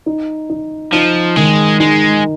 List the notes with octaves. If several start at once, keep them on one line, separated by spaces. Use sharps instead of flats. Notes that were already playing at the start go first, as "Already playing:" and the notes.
D#4
D#4
F3 D#4
D#3 G#3
G#3 D#4